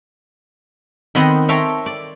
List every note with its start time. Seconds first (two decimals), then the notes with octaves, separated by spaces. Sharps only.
1.15 D#3 B3 C4 D#5 F#5 B5
1.49 C5 C#5 E5 G5 A5 A#5
1.86 D5